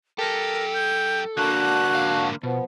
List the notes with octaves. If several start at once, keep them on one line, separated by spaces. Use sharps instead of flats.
F#2 G4 A4 A#4
G6
D3 A#3 D4 F#4 F#6
G#2 F5
B2 F3 B3